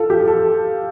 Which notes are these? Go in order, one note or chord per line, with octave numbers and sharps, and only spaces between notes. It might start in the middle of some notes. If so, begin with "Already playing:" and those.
Already playing: F4 A4
G4
A4